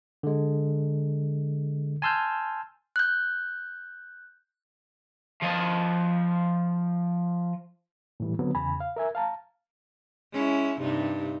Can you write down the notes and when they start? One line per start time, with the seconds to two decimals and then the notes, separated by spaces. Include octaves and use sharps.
0.23 D3 G#3
2.02 G#5 A5 C6 E6 F6 G6
2.96 F#6 G6
5.43 F3 D#5
8.20 A2 E3 G3
8.39 D3 F#3 B3 C4
8.55 E2 C#3 G#5 B5
8.80 F5
8.96 A#4 E5 G#5
9.15 F5 A5 A#5
10.33 G#3 C#4 E4
10.80 G2 C3 D#4